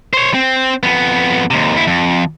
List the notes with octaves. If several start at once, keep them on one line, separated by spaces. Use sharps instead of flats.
C5 C#5
C4
F2 B3
D#2 C3
D#2 E4
F2